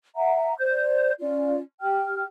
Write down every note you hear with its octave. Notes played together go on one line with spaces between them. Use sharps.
E5 F#5 A#5
C5 D5 G6
C#4 F4 D5
G4 G5 F6